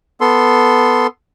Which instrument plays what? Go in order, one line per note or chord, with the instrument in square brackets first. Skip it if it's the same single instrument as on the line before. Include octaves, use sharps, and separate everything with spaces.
[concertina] B3 A4 C6